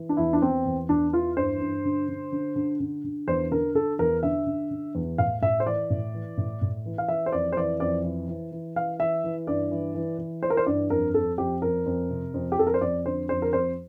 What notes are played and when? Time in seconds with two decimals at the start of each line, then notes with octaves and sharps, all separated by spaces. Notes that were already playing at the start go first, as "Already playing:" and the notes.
Already playing: E3
0.09 D4
0.17 E2 E4
0.33 D4
0.42 E2 C4
0.66 E2
0.89 E2 D4
1.13 E3 F4
1.37 G2 C5
1.61 G2
1.85 D3
2.08 D3
2.32 D3
2.56 D3
2.80 D3
3.04 D3
3.28 E2 C5
3.51 D3 A#4
3.75 D3 A4
3.99 E2 A#4
4.23 D3 E5
4.47 D3
4.71 D3
4.95 E2
5.18 A2 F5
5.42 A2 E5
5.60 C5
5.66 E3 D5
5.90 A2
6.14 E3
6.37 A2
6.62 A2
6.86 E3
6.98 F5
7.08 E3 E5
7.26 C5
7.32 F2 D5
7.52 C5
7.57 E3 D5
7.80 F2 D5
8.04 E3
8.29 E3
8.52 E3
8.76 E3 F5
9.00 E3 E5
9.24 E3
9.47 G2 D5
9.71 E3
9.95 E3
10.18 E3
10.43 E3 C5
10.50 A#4
10.57 C5
10.66 G2 D5
10.90 F2 A#4
11.14 F2 A4
11.38 F2 G4
11.62 F2 A#4
11.86 F2
12.09 C3
12.34 F2
12.52 G4
12.57 F2 A4
12.67 A#4
12.74 C5
12.81 F2 D5
13.05 D3 C5
13.29 F2 C5
13.42 A#4
13.53 F2 C5